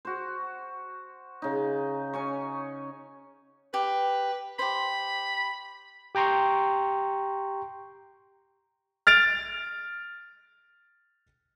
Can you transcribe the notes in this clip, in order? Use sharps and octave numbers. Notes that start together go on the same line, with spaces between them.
F#4 C5
C#3 D#4
C#4 G#5 C#6
G4 B4
G4 C5 B5
G4 G5 A#5 C6 C#6
F6 A6 D7 F7